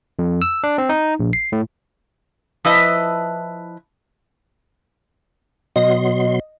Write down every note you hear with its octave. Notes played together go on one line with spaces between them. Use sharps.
F2
E6
D4
C4
D#4
A#1
C7
A2
F3 E4 B4 D#5 E5 A5
B2 F#3 D#5 C6